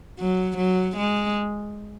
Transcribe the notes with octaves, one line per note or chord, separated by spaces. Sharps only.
F#3
F#3
G#3